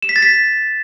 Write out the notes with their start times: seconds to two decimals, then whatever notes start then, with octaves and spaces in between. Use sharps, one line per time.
0.02 E7
0.09 B6
0.16 A6
0.22 B6